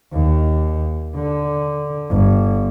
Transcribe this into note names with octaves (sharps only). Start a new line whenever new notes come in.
D#2
D3
G1